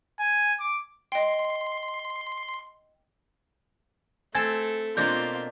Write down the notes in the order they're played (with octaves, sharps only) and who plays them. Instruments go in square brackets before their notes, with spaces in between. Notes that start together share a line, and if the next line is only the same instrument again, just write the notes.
[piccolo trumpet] G#5
D6
[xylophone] D#5 G5 [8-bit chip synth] C6
[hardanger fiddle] A3 [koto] C4 A4 [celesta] G#5 G#6
[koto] B2 A#3 D4 [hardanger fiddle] C4 F4 [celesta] G6